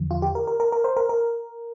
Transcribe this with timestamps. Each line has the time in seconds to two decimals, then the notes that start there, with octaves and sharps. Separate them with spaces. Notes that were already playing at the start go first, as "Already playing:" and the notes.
Already playing: E2 D3 F3
0.11 F4
0.22 G4
0.35 A#4
0.47 A#4
0.60 A#4
0.72 A#4
0.84 C5
0.97 A#4
1.09 A#4